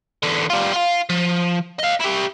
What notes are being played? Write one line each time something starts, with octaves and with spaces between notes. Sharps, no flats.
E2 D3
G3 F4
F4 F5
F3
D#5 F5
E4 G4